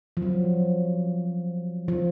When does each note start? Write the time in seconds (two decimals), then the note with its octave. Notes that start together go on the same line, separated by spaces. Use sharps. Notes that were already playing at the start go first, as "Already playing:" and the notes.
0.17 F3
0.22 F#3
1.88 F3